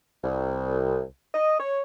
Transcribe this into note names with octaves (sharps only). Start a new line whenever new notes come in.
C2
D#5
C#5